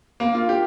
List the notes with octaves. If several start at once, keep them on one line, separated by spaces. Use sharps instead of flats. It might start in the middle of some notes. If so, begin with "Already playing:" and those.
A#3
F4
G4